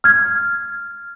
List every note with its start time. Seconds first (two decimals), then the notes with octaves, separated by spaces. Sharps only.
0.04 F6 G#6